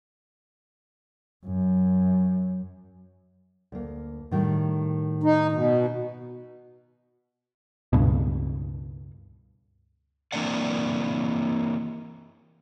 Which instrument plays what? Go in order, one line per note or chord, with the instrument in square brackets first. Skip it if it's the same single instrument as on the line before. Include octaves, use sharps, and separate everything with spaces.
[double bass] F#2
[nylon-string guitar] D2 A#3
A2 D#3 G3
[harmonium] D#4
B2
[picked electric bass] C#2 G2 B2
[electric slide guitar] E3 A#3 C4 D4 D5 F#5